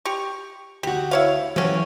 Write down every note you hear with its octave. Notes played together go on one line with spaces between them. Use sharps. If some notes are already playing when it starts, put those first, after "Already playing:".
G4 C#6
D2 F#4 G4
E4 C#5 F5
C3 E3 F#3 C#4 F#4 A4